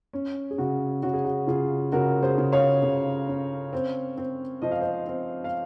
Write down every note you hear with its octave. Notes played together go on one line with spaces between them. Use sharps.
C#4
G#4
C#3 F#4
C#3 F#4
G#4
F#4
C#3 F4 G#4
C#3 F#4 A#4
G#4 C5
C#3
C#5 F5
C#3
C#4
C4
C4
F3 D#5
F5
C5 D#5
C4
F5